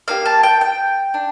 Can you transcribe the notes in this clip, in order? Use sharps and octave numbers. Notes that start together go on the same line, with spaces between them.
A#3 D4 G4 F5
A5
G5
G5
D4